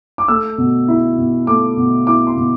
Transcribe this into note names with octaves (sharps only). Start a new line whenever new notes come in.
D6
A3 E6
B2
E4
B2
A3 D6
B2
E4 D6
C6
B2